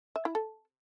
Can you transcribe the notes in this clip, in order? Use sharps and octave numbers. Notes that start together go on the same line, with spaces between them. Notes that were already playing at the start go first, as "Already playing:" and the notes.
E5
E4
A4